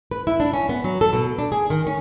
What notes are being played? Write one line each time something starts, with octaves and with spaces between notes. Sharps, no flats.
B4
E4
D4
C#4
B3
F#3
A4
B2
D4
G#4
D#3
C#4